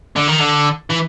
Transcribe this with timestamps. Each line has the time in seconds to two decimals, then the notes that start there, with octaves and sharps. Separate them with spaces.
0.16 D3
0.28 D#3
0.40 D3
0.90 E3